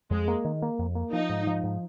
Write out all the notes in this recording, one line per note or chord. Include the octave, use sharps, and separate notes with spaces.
F2 G#3
A#3
D#3
A#3
F2
A#3
F3 D#4
G#2
F3
G#2